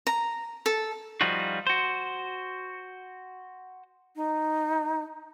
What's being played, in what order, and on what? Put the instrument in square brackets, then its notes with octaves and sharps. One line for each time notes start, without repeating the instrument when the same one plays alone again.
[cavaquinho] A#5
A4
[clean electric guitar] F3 G3 D#4 F4 F#4
F#4 C5
[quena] D#4